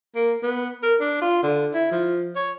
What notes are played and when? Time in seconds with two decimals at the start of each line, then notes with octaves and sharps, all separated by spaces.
0.15 A#3
0.43 B3
0.83 A#4
1.00 D4
1.21 F4
1.43 D3
1.74 E4
1.91 F3
2.36 C#5